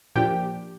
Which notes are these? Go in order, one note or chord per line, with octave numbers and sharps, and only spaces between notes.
A#2 F3 A#3 D4 G4 G5